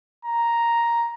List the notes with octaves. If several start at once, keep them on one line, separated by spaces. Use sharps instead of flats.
A#5